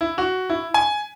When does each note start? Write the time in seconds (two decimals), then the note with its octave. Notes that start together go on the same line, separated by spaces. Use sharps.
0.01 E4
0.18 F#4
0.50 E4
0.74 G#5